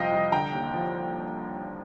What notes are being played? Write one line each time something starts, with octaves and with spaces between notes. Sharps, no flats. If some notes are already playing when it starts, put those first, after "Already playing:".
Already playing: C2 F2 C3 F3 D#5 F5 G5
C2
D3 G5 A#5
D#2
F3